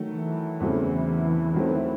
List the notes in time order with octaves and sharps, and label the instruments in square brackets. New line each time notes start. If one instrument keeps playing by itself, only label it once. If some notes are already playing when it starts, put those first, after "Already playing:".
Already playing: [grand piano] D#3 F#3 A3
[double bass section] E3
[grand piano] E2 C#3 F#3 A3 C4
D#3 F#3 A3 C4